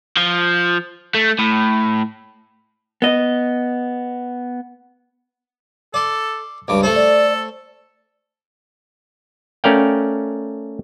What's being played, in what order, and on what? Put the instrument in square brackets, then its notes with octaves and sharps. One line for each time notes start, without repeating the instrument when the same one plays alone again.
[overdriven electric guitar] F3
A3
A2
[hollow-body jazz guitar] B3 D#5
[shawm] A4 [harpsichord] D5 C6
[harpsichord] C#2 G2 [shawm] D6
[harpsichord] A3 C5 [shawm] A4
[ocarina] D5
[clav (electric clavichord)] A3 C#4 A#4 D5 F5 G5